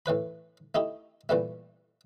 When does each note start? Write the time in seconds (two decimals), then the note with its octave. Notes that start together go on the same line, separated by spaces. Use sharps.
0.06 A2 E3 B4 B5
0.75 A3 D#4 E4 G4
1.29 A#2 E3 G3 A3